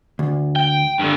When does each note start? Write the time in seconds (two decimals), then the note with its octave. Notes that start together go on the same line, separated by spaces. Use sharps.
0.19 D2
0.56 G5
1.01 G2 D3